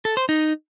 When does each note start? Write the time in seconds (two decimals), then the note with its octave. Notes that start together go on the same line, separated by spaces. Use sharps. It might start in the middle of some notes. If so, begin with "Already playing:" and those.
0.05 A4
0.17 C5
0.29 D#4